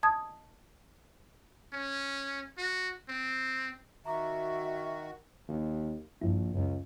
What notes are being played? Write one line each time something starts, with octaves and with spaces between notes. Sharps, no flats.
A5 D#6 G#6
C#4
F#4
C4
D#3 F#4 E5 A#5 D6
D#2
A#1 G2 E4
C#2 F#2